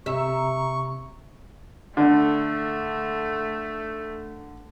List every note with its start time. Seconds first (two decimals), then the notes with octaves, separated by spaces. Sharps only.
0.06 C3 E5 A#5 C#6
1.97 D3 A3